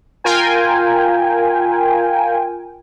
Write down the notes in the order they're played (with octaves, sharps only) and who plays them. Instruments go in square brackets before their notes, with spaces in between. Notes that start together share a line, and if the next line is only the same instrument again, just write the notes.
[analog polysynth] F4 A#4 G5 G#5